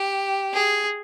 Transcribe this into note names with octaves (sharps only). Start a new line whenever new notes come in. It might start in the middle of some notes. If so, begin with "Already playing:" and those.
Already playing: G4
G#4